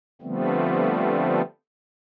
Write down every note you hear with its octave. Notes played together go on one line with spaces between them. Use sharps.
D3 F3 G3 A3 B3 C4